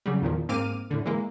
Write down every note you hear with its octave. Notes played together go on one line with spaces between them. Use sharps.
C#3 F#3 G3
E2 A#2 D#3 F3
G#2 A#3 C4 D6 F6 D#7
A2 D3
E3 G#3 A#3